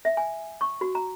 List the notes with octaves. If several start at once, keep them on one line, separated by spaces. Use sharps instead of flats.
E5
G#5
C#6
F#4
A#5